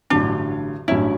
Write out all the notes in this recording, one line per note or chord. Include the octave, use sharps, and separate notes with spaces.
A1 G2 D3 F#3 D4
A1 G2 F#3 C#4 E4